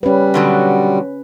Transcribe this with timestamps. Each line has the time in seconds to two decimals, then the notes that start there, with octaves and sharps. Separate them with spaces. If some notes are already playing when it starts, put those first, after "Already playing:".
0.03 G3 C#4 B4
0.34 B2 D3 F#3